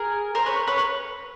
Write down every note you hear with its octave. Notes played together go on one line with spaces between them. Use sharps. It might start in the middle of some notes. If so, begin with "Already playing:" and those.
Already playing: G#4 A#4
A#4 C5
B4 C#5
B4 C#5